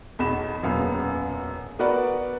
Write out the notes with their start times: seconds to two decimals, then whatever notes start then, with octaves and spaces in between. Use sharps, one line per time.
0.19 B1 E2 B5 E7
0.63 E1 F#2 A#2 B3 F5
1.79 B3 F#4 A#4 B4 D5 F#5